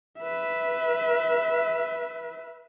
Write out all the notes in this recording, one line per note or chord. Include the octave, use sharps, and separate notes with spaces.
B4 E5